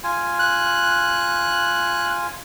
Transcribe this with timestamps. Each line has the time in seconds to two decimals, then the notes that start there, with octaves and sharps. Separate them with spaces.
0.04 F4 G#5
0.39 F#6